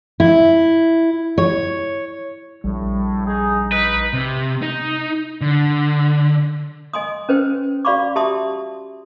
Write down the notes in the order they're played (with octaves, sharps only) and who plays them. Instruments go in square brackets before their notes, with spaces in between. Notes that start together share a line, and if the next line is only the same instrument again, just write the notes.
[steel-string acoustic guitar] E4
C#5
[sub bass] A#1 [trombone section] A2 [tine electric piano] G3
[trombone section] D#4 G#4
[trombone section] D#4 [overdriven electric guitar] B4
[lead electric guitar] C3
D#4
D3
[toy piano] D#5 G#5 C6 D#6
C#4 B4 C5 G5
F#4 D5 F5 B5 C#6 D6
G4 E5 A5 C6 D#6